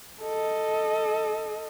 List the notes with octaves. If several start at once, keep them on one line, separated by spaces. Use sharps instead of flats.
A4 D#5